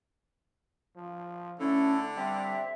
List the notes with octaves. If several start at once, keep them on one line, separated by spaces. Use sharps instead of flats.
F3
D3 A3 C#4 E4 A4
G3 C4 E5